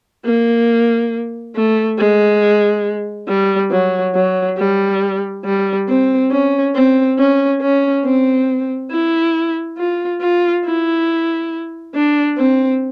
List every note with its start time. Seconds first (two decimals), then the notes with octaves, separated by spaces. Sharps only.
0.25 A#3
1.56 A3
1.98 G#3
3.28 G3
3.71 F#3
4.15 F#3
4.58 G3
5.45 G3
5.88 C4
6.31 C#4
6.75 C4
7.18 C#4
7.61 C#4
8.05 C4
8.91 E4
9.78 F4
10.21 F4
10.65 E4
11.95 D4
12.38 C4